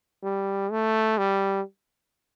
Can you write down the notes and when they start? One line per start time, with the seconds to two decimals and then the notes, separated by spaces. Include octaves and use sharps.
0.23 G3
0.71 A3
1.18 G3